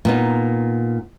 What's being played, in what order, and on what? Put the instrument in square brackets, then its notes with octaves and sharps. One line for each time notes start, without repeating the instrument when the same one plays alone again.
[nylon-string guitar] A#2 B3 D#4